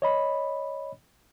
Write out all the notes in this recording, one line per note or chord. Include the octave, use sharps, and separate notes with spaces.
C#5 D#5 B5